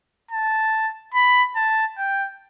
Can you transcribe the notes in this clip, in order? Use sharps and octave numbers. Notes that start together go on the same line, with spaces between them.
A5
B5
A5
G5